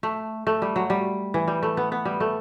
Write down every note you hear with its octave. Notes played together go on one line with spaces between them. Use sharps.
A3
A3
G3
F#3
G3
E3
G3
A3
B3
B3
G3
A3